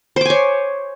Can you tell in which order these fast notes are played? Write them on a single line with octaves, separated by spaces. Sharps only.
C5 D6 G#5 C#5